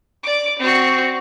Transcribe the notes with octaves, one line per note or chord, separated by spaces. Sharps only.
D5 D6
C4 F#4